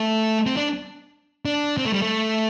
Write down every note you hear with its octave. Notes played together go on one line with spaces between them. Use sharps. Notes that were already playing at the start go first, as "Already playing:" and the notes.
Already playing: A3
C4
D4
D4
C4
A3
G3
A3